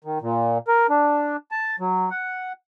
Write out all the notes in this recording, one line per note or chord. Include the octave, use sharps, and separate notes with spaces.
D#3
A#2
A#4
D4
A5
F#3
F#5